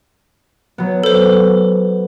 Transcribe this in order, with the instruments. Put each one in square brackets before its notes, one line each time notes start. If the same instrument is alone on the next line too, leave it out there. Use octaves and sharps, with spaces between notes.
[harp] F#3 B3
[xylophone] A4 C5